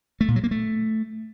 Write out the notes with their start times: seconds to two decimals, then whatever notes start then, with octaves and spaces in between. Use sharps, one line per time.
0.21 A3
0.28 A#2
0.36 F#3
0.44 A#3
0.51 A3